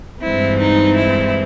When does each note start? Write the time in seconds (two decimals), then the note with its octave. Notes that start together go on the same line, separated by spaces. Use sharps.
0.22 G2 E3 G#3 C4 E4
0.60 D#4
0.97 E4